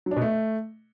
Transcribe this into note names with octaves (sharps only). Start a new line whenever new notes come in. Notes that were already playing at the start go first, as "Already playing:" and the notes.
F#3
D4
B2
A3